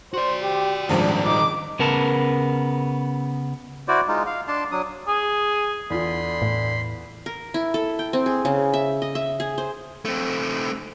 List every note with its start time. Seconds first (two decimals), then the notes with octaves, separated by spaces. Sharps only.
0.14 F#4 C5 D5
0.42 G4
0.89 G#1 C#2 D#3 F3 G3 D4
1.26 D#4 D6
1.79 C#3 B3 A#4 A5
3.88 E4 F#4 C5 D5
4.08 G#3 D#4 F4
4.27 F5
4.48 D4 A5 C6
4.72 F#3 D4 D#6
5.08 G#4
5.90 E2 D3 F4 B5 C6
6.42 A2
7.26 A#4
7.54 E4
7.74 A4
7.99 G5
8.13 C4
8.26 G#4
8.45 C#3
8.74 E5
9.02 D#5
9.15 E5
9.40 G#4
9.58 C5
10.05 A3 C4